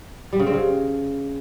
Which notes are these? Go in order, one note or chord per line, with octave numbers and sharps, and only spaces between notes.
G3
C#3
C4
C#3